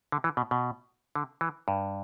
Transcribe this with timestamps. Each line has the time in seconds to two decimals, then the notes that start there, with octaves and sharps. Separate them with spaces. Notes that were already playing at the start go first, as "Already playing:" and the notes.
0.12 D3
0.24 E3
0.37 B2
0.51 B2
1.15 D3
1.41 E3
1.68 G2